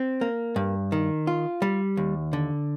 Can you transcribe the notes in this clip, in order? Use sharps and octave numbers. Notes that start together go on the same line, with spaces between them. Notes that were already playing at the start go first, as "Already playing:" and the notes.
Already playing: C4
A#3
G2
D#3
F4
G3
D#2
D3